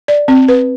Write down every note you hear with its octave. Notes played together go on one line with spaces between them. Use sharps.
D5
C4
B4